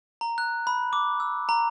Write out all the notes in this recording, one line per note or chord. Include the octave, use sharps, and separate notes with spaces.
A#5
F#6
B5
D6
E6
A#5